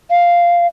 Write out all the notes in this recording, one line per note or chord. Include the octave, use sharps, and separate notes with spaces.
F5